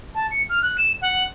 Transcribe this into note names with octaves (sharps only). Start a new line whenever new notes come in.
A5
C#7
F6
F#6
E7
F#5